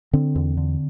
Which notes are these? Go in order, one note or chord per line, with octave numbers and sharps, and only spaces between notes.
D3 C4
E2
D3